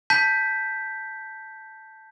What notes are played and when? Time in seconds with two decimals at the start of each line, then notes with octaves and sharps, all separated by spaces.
0.10 A5 G6 B6